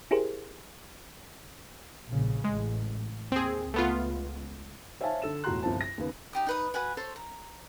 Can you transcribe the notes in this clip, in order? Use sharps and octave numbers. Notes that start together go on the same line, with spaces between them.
E4 G4 G#4 A#4 C5
A#1 C#3
A1 G#3
D#2 C4 G#4
C#2 A3 B3 F4
C5 C#5 E5 F5 G#5 A5
D3 A4 E7
E1 A2 F#4 A#5 C6 F#6
G1 C2 F3 C5 A5
A#6
D#2 C#3 B3
D#4 G4 D#6
D#4 B4 D#6
F#4 B4 F#5 G#5
A4 C5 C#5 C6
A#5